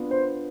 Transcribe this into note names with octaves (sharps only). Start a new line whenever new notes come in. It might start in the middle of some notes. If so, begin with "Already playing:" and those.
Already playing: B3 D4 F4
C5